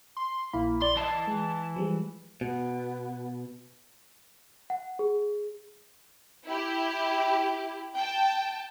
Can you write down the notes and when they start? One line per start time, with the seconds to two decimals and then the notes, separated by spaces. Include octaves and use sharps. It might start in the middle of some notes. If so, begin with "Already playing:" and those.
0.17 C6
0.53 A#1 A#3 E4 B5
0.82 D5 C6
0.97 E3 D#5 A5 A6 C7
1.27 G#3
1.76 F3 G3 G#3
2.41 B2 B3
4.70 F#5
4.99 G#4
6.46 E4 G4
7.97 G5 A5